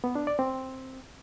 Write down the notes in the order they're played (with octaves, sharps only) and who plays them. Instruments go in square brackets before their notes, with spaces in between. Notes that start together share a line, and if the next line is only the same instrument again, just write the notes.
[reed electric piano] B3
D4
D5
C4